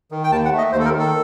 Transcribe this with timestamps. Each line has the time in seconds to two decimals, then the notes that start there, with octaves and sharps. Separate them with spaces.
0.11 D#3
0.24 G5
0.31 D#2 A5
0.45 F#5
0.52 A3
0.58 D#5
0.72 D#2 C5
0.79 A4
0.85 A#4
0.92 D#3
0.99 A4